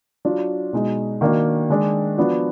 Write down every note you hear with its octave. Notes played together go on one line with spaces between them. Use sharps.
F#3 D4 F4
B2 G#3 D#4
D#3 A#3 D4 F#4
D#3 G#3 D4
F3 B3 D4 F#4